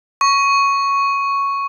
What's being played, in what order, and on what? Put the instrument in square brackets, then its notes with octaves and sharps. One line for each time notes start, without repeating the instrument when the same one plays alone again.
[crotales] C#6